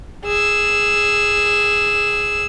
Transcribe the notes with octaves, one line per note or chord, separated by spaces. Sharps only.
G#4 E6